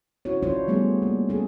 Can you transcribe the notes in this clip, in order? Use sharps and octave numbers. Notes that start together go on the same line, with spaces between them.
C#4 E4 F#4 C#5
D4 E4 F4 C5 C#5
G3 A3 B3 G#4
A#3
C#4 G#4 A4